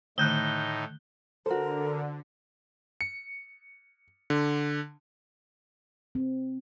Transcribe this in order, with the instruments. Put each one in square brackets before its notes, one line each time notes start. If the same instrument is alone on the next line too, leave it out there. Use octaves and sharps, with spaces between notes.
[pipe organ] A2 D#4 [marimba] D3 D#3 A3 [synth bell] F#6 G6 G7
[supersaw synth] D3 [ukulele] F#4 C5 [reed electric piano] A4 [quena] A#4
[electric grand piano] C#7
D3
[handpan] C4